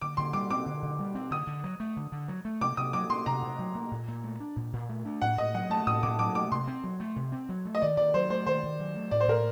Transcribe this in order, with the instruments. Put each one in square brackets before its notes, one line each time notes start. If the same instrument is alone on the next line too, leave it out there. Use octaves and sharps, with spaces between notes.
[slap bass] D3 [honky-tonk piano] D6
[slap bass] D3 [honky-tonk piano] C6
[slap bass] G3 [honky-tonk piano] D6
[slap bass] C4 [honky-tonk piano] D6
[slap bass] D3
D3
G3
C4
[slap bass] D3 [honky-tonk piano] D#6
[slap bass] D3
F#3
A3
D3
D3
F#3
A3
[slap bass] C3 [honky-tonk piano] D6
[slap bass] C3 [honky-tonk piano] D#6
[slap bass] F#3 [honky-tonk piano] D6
[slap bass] A#3 [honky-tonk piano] C6
[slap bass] C3 [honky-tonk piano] A#5
[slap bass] C3
F#3
A#3
A#2
A#2
A3
D4
A#2
A#2
A3
D4
[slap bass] A2 [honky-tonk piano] F#5
[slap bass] A2 [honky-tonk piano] D#5
[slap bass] F#3 [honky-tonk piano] F#5
[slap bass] A3 [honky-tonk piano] A5
[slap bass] A2 [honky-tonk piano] D#6
[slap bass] A2 [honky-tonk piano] D6
[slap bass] F#3 [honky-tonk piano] D6
[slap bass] A3 [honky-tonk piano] D6
[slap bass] C3 [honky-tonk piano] C6
[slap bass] C4
F#3
A3
C3
C4
F#3
A3
[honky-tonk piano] D#5
[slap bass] D#3 [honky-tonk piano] D5
[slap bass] D#3 [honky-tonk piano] D5
[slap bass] F#3 [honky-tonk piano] C5
[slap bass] A3 [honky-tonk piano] C5
[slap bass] D#3 [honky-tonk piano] C5
[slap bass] D#3
F#3
A3
[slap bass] A2 [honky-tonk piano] D5
[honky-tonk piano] C5
[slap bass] A2 [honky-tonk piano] A#4